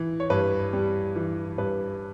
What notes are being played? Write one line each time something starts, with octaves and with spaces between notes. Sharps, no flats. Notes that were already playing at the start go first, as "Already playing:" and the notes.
Already playing: E3
C#5
G2 B4
G3
E3
G2 B4